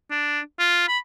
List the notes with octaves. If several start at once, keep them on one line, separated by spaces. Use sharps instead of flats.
D4
F4
B5